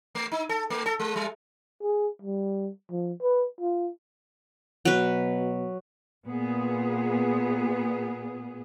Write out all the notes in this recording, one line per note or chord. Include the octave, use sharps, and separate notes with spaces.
A3
D#4
A4
A3
A4
G#3
G3
G#4
G3
F3
B4
F4
B2 F#3 B4
A#2 B3 G#4